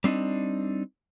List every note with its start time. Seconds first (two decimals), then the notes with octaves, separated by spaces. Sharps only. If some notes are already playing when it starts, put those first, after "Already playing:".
0.04 G3 C4 D4 D#4